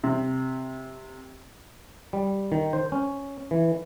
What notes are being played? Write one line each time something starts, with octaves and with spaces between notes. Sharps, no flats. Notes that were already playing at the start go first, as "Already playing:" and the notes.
C3
G3
D#3
C5
C#4
E3